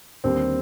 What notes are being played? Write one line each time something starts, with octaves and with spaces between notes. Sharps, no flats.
D#2 D3 G3 C4